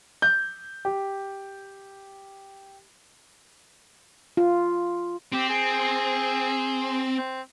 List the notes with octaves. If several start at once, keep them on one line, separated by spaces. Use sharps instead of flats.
G6
G4
F4
C4 G4
G#4
C4